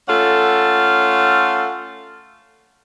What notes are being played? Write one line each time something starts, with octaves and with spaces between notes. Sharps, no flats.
A3 C#4 F4 A4 F#5